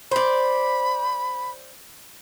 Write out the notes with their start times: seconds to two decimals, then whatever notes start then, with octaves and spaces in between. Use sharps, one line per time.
0.11 C5 D5 B5